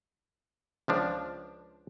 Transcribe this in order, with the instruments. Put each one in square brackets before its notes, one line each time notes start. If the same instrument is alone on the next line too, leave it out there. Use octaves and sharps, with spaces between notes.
[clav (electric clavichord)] C#2 F3 D4